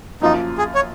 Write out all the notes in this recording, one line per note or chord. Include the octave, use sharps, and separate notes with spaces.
F#2 F3 A#3 D#4 F4
G#4
C#5